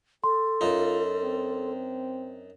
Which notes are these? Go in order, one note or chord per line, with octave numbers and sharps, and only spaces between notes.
A4 C6
F#2 D#4 F4
C4